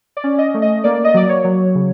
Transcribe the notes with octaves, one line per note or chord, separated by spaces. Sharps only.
D5
C#4
D#5
A3
D#5
A#3 D5
D#5
F#3 D5
C#5
F#3
C#3